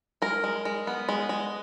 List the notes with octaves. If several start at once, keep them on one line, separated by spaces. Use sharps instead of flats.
G#3 A#4
G#3
G#3
B3
G#3
G#3